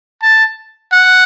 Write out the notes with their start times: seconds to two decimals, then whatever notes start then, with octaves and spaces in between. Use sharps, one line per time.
0.22 A5
0.92 F#5